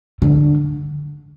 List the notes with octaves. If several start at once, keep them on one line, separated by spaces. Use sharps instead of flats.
D3